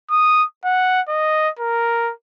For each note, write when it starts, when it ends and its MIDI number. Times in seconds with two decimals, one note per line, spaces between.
0.11 0.44 87
0.65 1.01 78
1.08 1.49 75
1.59 2.13 70